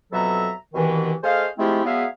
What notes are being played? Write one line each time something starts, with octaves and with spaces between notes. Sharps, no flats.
F2 B2 F#3 A4 E5 A#5
C2 B2 D#3 E3
A3 G#4 C5 D#5 F5
F3 G#3 A3 C4 E4 G4
F#3 G#3 B3 G#4 E5 F5